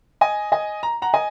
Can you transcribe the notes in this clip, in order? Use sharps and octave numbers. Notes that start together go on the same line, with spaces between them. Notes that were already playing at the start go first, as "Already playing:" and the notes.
D#5 G#5
D#5 G#5
A#5
F#5 A#5
D#5 G#5